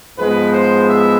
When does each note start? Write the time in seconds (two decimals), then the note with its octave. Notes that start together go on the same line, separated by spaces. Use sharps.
0.17 G#2 F3 G#3 B3 B4
0.52 C5
0.87 E5